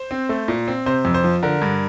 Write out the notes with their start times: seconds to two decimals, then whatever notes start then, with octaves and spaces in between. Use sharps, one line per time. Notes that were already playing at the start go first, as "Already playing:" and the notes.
Already playing: C5
0.11 C4
0.29 A3
0.48 A#2
0.68 C4
0.86 C3 C5
1.05 F2
1.14 C5
1.24 F3
1.43 D3 A#4
1.62 G2